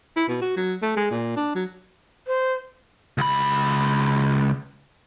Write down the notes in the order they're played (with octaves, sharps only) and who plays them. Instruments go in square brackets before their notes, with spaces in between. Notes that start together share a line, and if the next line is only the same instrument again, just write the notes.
[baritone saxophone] E4
B2
F#4
F#3
A3
G#3
A#2
D4
F#3
[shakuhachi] C5
[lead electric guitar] C#2 B5